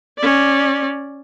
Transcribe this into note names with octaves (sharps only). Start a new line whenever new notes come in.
C#4 D5